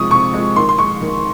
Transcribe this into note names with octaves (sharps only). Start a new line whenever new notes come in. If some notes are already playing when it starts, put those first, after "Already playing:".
Already playing: C3 F3 G#3 C#6 D#6
C3 C#6
F3 G#3
D#3 C6
C6
G#3 C#6
D#3